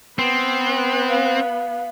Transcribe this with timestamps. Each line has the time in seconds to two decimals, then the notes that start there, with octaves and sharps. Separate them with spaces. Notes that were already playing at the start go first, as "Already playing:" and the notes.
0.19 B3 C4 B4
1.09 F5